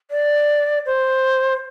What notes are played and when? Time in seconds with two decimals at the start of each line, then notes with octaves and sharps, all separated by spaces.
0.11 D5
0.86 C5